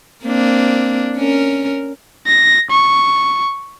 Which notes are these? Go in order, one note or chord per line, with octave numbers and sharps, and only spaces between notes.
A#3 C4 D4
C#4 A#4
A#6
C#6